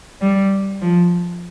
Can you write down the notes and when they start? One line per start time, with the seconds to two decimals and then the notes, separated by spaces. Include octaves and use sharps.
0.21 G3
0.81 F3